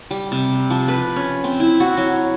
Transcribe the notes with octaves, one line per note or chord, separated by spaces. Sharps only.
G3
C3
F3
B4
C#4
C4
E4
F#4
F#3